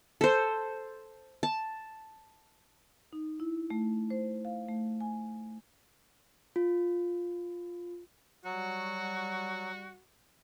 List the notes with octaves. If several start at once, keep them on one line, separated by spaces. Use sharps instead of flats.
A4 C5
A5
D#4
E4
A3
C5
F5
A3
G#5
F4
F#3 G3 F#4